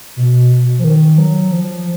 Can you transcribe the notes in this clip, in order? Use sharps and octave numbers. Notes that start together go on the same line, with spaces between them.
B2
F3
D#3
F#3
F3